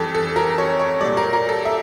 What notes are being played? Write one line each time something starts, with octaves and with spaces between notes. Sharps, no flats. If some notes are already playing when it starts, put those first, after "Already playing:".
Already playing: F2 E3 G3 A4
A4
A#4
C#5
C#5
G3 D5
A#2
A#4
A#4
A4
E5